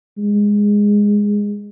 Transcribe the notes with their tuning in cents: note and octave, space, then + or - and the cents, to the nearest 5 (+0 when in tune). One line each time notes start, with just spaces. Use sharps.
G#3 -10